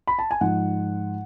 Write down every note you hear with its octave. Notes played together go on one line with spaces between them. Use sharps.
B5
A5
G#5
G#2 F3 F#5